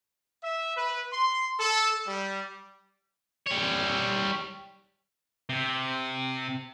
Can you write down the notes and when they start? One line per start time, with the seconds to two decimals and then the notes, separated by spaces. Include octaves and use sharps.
0.43 E5
0.77 B4
1.13 C6
1.59 A4
2.07 G3
3.47 G3 C#5
5.49 C3